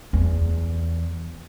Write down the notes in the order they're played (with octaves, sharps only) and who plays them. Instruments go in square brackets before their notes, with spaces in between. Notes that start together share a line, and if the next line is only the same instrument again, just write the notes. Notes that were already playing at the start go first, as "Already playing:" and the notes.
[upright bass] E2